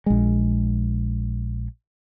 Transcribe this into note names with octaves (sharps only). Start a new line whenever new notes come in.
A#1 G#3